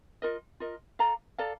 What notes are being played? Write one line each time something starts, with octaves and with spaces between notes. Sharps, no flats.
F4 A#4 D#5
F4 A#4 D#5
A4 D5 F5 A#5
A4 D5 F5 A#5